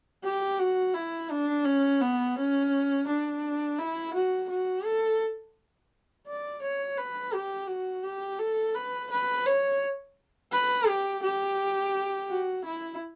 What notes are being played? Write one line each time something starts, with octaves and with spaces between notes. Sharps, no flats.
G4
F#4
E4
D4
C#4
B3
C#4
D4
E4
F#4
F#4
A4
D5
C#5
B4
G4
F#4
G4
A4
B4
B4
C#5
B4
G4
G4
F#4
E4